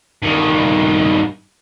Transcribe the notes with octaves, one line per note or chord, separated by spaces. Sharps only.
G2 D#3